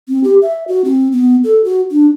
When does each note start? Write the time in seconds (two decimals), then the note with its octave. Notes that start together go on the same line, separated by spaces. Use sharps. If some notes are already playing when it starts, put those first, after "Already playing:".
0.09 C4
0.24 G4
0.42 E5
0.68 F#4
0.85 C4
1.12 B3
1.44 A4
1.64 F#4
1.91 D4